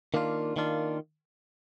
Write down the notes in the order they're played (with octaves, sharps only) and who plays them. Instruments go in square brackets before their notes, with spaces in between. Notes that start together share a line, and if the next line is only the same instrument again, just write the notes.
[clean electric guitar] D#3 A#3 D4 F4
D#3 A#3 D4 F4